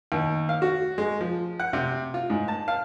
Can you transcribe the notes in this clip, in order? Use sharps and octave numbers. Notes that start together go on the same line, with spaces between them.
D#2
F5
F#4
G#3
F3
F#5
C3
F4
G#2
A5
F5